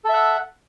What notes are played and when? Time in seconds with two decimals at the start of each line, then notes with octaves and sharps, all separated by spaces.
0.04 A4
0.09 E5
0.13 F#5